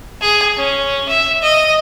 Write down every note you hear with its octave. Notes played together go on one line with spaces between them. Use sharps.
G#4
C#4
E5
D#5